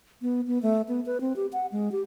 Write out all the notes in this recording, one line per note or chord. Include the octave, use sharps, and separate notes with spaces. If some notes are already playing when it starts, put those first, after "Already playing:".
B3
B3
A3
B3
B4
C4
G4
F#5
G#3
G4